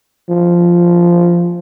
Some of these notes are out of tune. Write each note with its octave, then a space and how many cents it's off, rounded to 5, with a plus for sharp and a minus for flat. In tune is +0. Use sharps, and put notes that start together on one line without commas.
F3 -10